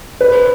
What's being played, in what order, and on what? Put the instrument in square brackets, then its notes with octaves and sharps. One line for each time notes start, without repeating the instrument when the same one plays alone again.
[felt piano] B4